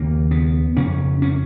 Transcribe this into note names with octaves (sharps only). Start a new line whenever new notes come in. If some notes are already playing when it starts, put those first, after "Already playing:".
Already playing: D#2 C#3 A#3
B3
F2 C#3 C#4
C#4